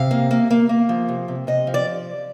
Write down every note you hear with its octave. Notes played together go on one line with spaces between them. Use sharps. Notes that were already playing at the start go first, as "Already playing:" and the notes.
Already playing: C3 F5
A#3
A#3
A#3
A#3
F3
C3
C3
C3 D#5
F3
D5